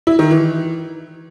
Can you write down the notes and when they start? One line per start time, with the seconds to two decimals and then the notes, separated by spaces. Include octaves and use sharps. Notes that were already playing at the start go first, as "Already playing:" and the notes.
0.07 E4
0.19 D#3
0.31 E3